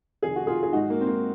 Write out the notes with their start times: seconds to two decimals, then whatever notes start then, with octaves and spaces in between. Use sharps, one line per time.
0.23 F2 C3 D#3 G#4
0.36 F#4
0.47 F4 G#4
0.63 G#4
0.73 G#2 F#3 D#4 F#4
0.90 A#3
1.01 C4
1.07 A#3